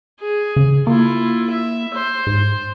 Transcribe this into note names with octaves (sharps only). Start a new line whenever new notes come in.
G#4
C#3
A#3 E4 F4
E5
C5
G#2